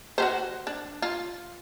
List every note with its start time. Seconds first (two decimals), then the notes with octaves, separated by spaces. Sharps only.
0.18 F#4 G4 C5
0.67 D4
1.02 F4